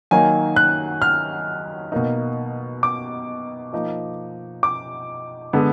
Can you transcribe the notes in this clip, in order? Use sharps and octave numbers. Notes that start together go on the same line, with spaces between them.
D#3 F#3 A#3 D#4 G#5
F#6
F6
B2 A#3 D#4
D6
F3 A#3 D#4
D6
D3 G#3 B3